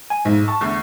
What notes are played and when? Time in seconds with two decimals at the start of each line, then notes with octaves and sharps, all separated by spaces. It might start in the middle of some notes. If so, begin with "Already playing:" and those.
0.10 G#5
0.25 B1 G#2
0.48 A5 C#6
0.61 E2 D3 A3